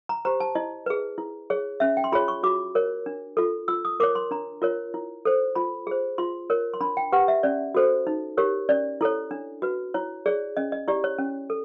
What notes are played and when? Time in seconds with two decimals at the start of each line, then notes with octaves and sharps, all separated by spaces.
0.09 A#5
0.25 G4 C5 A#5
0.40 A5
0.55 E4 D#5
0.86 G#4 B4
1.18 E4
1.50 G#4 C#5
1.80 C#4 E5
1.97 G5
2.04 C6
2.12 F4 G#4 C#5 B5
2.28 C#6
2.43 F#4 D6
2.75 A#4 C#5
3.06 D4
3.37 F4 A4
3.68 F4 E6
3.85 D#6
4.00 A#4 C#5 D6
4.15 C6
4.31 D4 A#5
4.62 F4 A#4 C#5
4.94 E4
5.25 A4 C5
5.55 F4 B5
5.87 G#4 C5
6.18 F4 C6
6.50 A#4 C#5
6.74 C6
6.81 D4 B5
6.97 G5
7.12 G4 B4 F#5
7.28 E5
7.43 C#4 D5
7.75 F#4 A4 C5
8.07 D#4
8.37 G4 A#4 C#5
8.69 C#4 D5
9.01 E4 A4 C#5
9.31 D4
9.62 F#4 B4
9.94 E4 C#5
10.26 G#4 C#5 D5
10.57 C#4 D#5
10.72 D#5
10.88 E4 G4 D5
11.04 C#5
11.18 C#4
11.50 A4